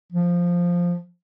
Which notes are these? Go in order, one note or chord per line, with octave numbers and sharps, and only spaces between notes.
F3